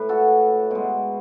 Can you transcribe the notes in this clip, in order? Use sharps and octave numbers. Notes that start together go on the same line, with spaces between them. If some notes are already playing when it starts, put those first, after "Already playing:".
Already playing: A2 A3 B4
F#4 A4
B2 G#3